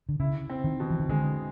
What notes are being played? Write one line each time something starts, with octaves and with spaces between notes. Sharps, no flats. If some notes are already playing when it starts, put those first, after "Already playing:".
D3
C#3 E4
C4
D#3
B2
E3
D#3
D3 G#3